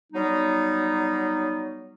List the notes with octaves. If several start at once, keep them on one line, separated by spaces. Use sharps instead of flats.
F#3 G3 B3 D#4